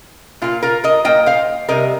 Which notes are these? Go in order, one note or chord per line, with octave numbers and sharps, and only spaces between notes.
A#2 A#3 F4
F4 A#4
A#4 D#5
A#2 A#3 D#5 G5
C5 F5
C3 G3 C4 A#4 D#5